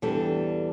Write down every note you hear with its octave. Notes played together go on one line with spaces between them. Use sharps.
E2 E3 G3 D4 A4